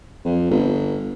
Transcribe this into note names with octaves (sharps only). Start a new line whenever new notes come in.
F2
G1